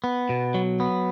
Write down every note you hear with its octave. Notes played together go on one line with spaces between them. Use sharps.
B3
B2
F#3
B3